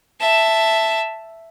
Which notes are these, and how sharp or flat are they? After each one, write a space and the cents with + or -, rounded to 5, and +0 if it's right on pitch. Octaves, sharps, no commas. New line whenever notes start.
E5 +0 A5 +0